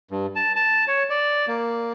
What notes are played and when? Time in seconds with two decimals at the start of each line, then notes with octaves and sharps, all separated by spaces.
0.11 G2
0.36 A5
0.56 A5
0.88 C#5
1.10 D5
1.48 A#3